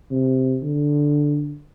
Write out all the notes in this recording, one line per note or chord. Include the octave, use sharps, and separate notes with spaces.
C3
D3